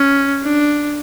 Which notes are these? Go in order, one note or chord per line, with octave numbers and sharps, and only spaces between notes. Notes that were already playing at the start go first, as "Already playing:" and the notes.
Already playing: C#4
D4